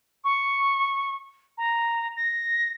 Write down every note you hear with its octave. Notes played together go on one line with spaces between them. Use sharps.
C#6
A#5
A#6